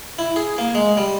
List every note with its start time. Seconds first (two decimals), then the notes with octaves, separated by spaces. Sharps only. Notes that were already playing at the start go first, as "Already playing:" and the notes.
0.19 E4
0.36 G#4
0.58 A#3
0.75 G#3
0.97 G3